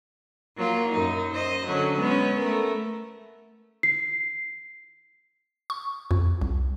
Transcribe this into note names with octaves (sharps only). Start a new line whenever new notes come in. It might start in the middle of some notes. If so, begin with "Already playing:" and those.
F#3 A#3 F4
F#2 D#4
C5 D#5
D3 F#3 C#4
G#3 B3 C#4
A3 A#4
C7
C#6
F2
C2